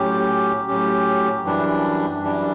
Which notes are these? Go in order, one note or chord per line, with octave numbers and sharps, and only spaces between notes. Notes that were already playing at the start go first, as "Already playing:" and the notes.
Already playing: A2 F#3 C#4 G4
A2 F#3 C#4 G4
F#2 E3 G3 D4
F#2 E3 G3 D4